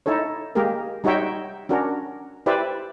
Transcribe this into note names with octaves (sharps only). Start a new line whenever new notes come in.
D#4 E4 A4 C#5
G#3 A#3 G4 G#4 A#4
G3 D#4 F#4 C#5 E5 G5
C#4 D4 F#4 A#4
E4 G4 B4 C5 D5 E5